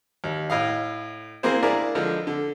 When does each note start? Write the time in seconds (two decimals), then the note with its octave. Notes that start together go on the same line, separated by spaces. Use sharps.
0.24 D#2
0.50 A2 D#5 F5
1.43 E3 A#3 C4 G#4 C5
1.63 D4 E4 G#4 A#4 D5 F5
1.95 D3 F3 G#3
2.27 D3